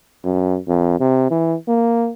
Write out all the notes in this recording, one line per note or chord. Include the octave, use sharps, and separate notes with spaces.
F#2
F2
C3
E3
A#3